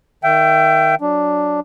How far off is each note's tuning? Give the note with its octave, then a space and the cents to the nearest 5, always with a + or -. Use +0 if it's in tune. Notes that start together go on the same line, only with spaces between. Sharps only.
D#3 +0 E5 +30 G5 -10
F#3 +0 D4 +0